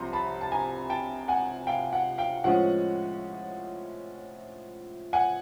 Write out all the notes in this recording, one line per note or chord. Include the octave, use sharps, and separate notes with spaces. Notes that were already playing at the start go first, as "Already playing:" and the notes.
Already playing: C2 C3 F3 A#5 C6
A5 B5
A5
G#5 A#5
G5 A5
F#5 G#5
F5 G5
F#5
F5 G5
A2 F3 G#3 C#4 F#5
F#5 G#5